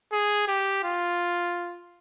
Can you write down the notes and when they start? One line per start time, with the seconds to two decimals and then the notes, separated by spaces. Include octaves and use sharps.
0.13 G#4
0.48 G4
0.84 F4